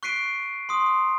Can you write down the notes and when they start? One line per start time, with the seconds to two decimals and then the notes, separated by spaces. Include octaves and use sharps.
0.03 C#6 F#6 B6 C7 D7 D#7
0.69 C6 D#6